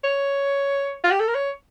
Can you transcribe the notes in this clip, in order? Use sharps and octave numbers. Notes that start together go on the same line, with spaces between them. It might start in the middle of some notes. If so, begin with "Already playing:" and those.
C#5
F4
G4
A4
A#4
C#5